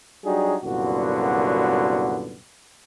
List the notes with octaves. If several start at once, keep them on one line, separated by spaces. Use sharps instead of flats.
F#3 G3 D4 D#4 F#4 G#4
C2 F#2 A#2 D3 B3 F#4